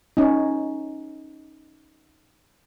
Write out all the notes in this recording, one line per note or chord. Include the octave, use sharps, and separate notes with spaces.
C#4 D#4